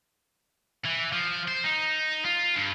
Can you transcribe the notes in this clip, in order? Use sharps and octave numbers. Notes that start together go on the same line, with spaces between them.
E3
F3
C5
D#4
F4
G2